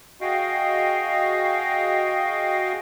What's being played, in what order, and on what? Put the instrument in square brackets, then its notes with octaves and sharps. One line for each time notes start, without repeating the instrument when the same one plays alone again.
[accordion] F#4 G#4 D#5 F5 G5